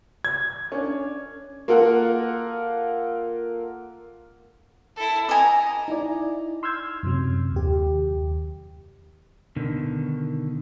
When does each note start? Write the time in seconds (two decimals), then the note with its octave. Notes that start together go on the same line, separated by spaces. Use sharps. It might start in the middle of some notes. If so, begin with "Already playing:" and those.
0.25 G#6
0.72 C#4 D4
1.68 A#3 F4 A4 A#4 F#5
4.96 E4 A4
5.29 D#5 G#5 A#5
5.88 D#4 E4 D5
6.63 C6 E6 F6 G6 G#6
7.03 F#2 C3 F#3
7.52 D#2 G4
9.56 B2 D3 D#3